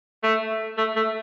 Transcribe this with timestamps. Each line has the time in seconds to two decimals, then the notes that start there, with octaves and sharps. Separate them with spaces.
0.23 A3
0.78 A3
0.96 A3